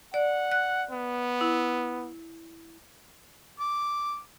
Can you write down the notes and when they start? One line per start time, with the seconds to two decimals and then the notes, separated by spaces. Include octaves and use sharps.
0.14 D5 F#5
0.52 F#6
0.91 B3
1.41 E4
3.59 D6